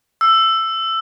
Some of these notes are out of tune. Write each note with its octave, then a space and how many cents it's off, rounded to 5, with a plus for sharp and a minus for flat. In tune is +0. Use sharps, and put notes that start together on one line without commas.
E6 +10